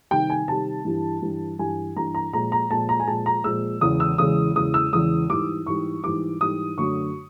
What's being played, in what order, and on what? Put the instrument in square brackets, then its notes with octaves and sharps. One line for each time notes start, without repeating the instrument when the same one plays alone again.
[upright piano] C3 D#3 G3 G5
G#5
C3 D#3 G3 A5
G2 E3 G3
G2 E3 G3
G2 E3 G3 G#5
G2 E3 G3 A#5
A#5
A#2 F3 G#3 A#5
A#5
A#2 F3 G#3 A5
A#5
G#5
A#2 F3 G#3 A5
A#5
A#2 F3 G#3 E6
E2 C#3 E3 G#3 D#6
E6
E2 C#3 E3 G#3 D#6
E2 C#3 E3 G#3 D#6
E6
E2 C#3 E3 G#3 D#6
G#2 E3 G3 D6
G#2 E3 G3 C#6
G#2 E3 G3 D6
G#2 E3 G3 D#6
F#2 D3 F#3 A3 C#6